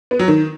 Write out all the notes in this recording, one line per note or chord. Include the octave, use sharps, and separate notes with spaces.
B3
F#3
D#3